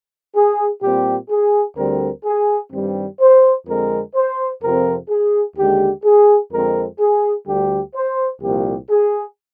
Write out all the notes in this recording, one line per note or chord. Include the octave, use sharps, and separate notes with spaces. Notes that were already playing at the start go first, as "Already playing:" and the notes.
G#4
A#2 G3 C4 G4
G#4
D2 D3 G3 C4 A#4
G#4
G2 D#3 G3 C4
C5
F2 D3 G#3 C4 A#4
C5
F2 C3 F3 C4 A#4
G#4
D#2 D3 G#3 G4
G#4
F2 D3 G#3 C4 A#4
G#4
D2 D3 G3 G4
C5
C2 A#2 F3 A#3 G4
G#4